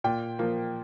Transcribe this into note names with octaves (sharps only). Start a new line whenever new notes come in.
A#2 G5
F3 A#3